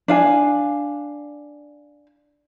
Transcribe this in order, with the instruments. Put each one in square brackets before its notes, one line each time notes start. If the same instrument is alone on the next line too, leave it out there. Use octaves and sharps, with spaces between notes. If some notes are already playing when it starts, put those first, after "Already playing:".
[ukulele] D4 F5 G#5